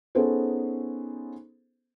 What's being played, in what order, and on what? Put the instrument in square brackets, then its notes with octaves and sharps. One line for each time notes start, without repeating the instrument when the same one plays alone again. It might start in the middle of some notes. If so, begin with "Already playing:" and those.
[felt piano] B3 C#4 D#4 G#4 A4 C5